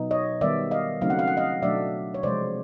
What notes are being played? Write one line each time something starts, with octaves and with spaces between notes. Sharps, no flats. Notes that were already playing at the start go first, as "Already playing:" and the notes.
Already playing: B2 F#3 B3 D#4
C#5 D#5
D#3 G3 B3 D5 E5
D#5 F5
C#3 F#3 A3 C4 D#4 F5
F#5
F5
F#5
D#5 F5
B2 F#3 A3 D4 D5 E5
C#5
C3 F3 G#3 C5 D5